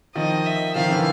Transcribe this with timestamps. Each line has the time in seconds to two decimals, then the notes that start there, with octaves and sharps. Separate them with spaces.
0.15 D#3 F3 D#5
0.46 E5
0.75 D#3 F3 F5
0.90 D3 E3